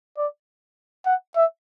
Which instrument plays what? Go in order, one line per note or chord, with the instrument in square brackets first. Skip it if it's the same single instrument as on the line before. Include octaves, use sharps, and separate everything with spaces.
[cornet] D5
F#5
E5